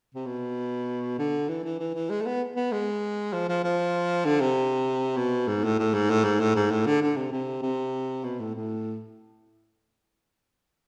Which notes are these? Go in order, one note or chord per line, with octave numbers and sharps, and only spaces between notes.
C3
B2
D3
E3
E3
E3
E3
G#3
A3
B3
B3
G#3
F3
F3
F3
D3
C3
B2
G#2
A2
A2
G#2
A2
G#2
A2
G#2
A2
D3
D3
C3
C3
C3
B2
A2
A2